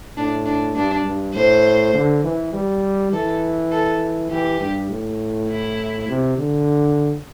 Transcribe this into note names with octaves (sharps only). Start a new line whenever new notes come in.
A2 D4
D4
G2 D4
G2
A2 C5
D3
E3
G3
E3 A4
A4
E3 G4
G2
A2
E4
C3
D3